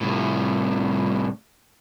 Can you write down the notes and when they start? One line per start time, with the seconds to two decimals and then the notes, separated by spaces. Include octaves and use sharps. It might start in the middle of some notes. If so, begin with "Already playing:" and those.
0.01 C2 A2